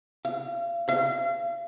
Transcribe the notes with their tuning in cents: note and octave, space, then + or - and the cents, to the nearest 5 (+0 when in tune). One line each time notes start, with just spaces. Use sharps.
F5 -35
F5 -35